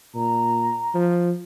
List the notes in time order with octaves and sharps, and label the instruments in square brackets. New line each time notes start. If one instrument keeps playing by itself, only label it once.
[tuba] A#2 [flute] A#5
[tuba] F3